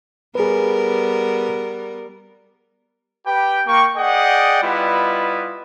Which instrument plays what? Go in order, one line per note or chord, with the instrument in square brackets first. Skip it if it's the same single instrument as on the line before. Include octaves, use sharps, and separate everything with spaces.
[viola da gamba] G3 B3 A#4 [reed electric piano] G#4 B4
[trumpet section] G4 B4 G5
A#3 G5 C#6
G#4 D5 D#5 F#5 G5
G3 B3 E4 F4 B4 D#5